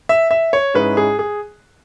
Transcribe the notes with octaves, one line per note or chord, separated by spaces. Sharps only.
E5
E5
C#5
G#2 G#3 C#4 E4 B4
G#4
G#4